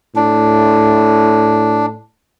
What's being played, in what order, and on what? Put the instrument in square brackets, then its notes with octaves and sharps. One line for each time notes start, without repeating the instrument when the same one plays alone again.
[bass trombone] A2 [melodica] D4